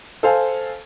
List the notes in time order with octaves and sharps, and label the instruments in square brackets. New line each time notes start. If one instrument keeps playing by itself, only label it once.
[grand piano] A4 C5 F5 G#5